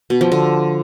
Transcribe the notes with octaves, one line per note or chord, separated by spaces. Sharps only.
B2
F3
D3